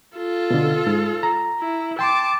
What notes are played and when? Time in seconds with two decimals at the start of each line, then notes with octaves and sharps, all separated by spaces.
0.16 F4 A4
0.50 B2 D3
0.87 G#2
1.23 A#5
1.60 E4
1.99 G5 A5 C6 D6